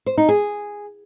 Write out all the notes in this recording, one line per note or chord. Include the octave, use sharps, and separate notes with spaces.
C5
D#4
G#4